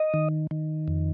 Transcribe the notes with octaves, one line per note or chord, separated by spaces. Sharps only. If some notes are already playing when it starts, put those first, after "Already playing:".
Already playing: D#5
D#3
D#3
F2